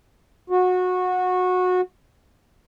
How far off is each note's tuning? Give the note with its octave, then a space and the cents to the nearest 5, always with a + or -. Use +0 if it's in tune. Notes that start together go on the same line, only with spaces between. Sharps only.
F#4 -20